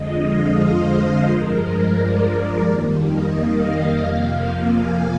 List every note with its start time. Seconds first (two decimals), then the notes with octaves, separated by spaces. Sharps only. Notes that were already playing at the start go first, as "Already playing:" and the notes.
Already playing: F2 D3 F3 G#3 D#5
0.21 F5
0.56 C5
0.90 C5
1.25 G2 F3 G#3 A#4
1.94 D5
2.63 F2 D#3 G3 A#3
2.98 D#5
3.33 F5
3.67 D#5
4.02 F2 C3 F3 A#3 F5
4.71 G#5